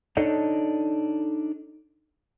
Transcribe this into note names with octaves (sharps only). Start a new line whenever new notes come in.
D4 D#4 A4 C#5 D#5